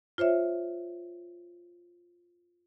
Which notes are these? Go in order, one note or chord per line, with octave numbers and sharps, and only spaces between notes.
F4 C5 C#5 E5